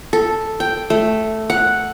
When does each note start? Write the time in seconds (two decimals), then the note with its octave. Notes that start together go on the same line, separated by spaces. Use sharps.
0.13 A4
0.60 G5
0.90 A3
1.50 F#5